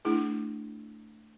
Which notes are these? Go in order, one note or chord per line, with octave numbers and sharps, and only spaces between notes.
A3 D4 E4 G#4